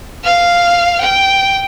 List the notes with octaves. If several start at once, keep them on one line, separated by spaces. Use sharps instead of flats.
F5 F6
G5